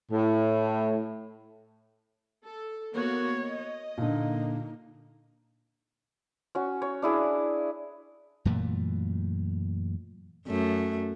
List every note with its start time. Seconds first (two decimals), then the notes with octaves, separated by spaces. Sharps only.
0.12 A2
2.43 A4
2.94 A#3 B3 F#4 C#5
3.42 D#5
3.97 A#2 D3 A#3 D#4
6.55 C#4 F#4
6.82 C#5
7.02 D4 E4 G#4
8.45 F#2 A#2 E3 A3
10.47 F#2 A3